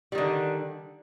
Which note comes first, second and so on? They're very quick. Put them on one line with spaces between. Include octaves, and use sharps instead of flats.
G3 D#3 D3